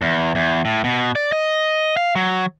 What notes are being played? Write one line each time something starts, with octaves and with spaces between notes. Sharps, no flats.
E2
E2
A2
B2
D5
D#5
F5
F#3